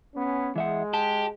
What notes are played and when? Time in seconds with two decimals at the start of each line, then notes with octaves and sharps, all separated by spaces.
0.15 B3 C#4
0.56 E3 G#3 E5 F#5
0.94 G4 A5